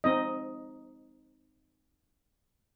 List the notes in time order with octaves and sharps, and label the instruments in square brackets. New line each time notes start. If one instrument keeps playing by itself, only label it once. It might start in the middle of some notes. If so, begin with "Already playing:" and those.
[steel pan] C4 D#4 D#5